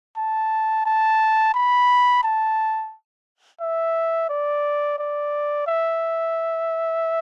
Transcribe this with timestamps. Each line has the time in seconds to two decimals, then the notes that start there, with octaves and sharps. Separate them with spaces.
0.17 A5
0.86 A5
1.54 B5
2.23 A5
3.60 E5
4.29 D5
4.98 D5
5.67 E5